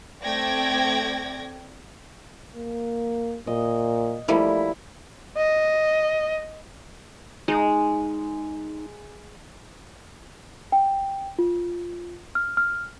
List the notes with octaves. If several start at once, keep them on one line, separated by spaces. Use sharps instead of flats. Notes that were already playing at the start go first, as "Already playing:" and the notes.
A3 C4 D5 G5 G#6 A#6
A#3
A#2 D#5
F3 G3 A3 A#3 E4
D#5
G#3 D#4
G5
F4
F6
F6